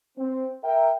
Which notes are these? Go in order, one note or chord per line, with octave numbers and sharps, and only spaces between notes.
C4
A#4 E5 G5